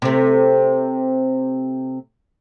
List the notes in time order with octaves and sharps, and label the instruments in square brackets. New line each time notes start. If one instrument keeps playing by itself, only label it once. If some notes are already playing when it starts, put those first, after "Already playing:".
[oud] C3 A3